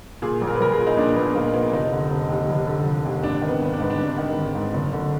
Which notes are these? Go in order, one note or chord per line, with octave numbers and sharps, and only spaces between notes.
A#2 G#4
A#1
A#4
B4
A#1 A#4
G#4
A#2
D#4
A#2 D4
A#1 B3
A#1 A#3
A#2 B3
F1 D#4
D3
F1
D#2
F1
D3
F1
D#2
G#1 D4
D#3
B3
G#1
D4
G#2 B3
D4
G#1
D#3
G#1
G#2
F#1
D3